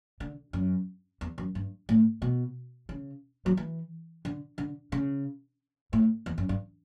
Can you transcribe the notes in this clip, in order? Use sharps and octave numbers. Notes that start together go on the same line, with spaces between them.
D3
F#2
E2
F#2
G2
A2
B2
C#3
F#3
E3
D3
D3
C#3
A2
E2
F#2
G2